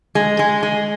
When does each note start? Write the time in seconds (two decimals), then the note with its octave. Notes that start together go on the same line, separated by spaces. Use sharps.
0.15 G#3
0.39 G#3
0.63 G#3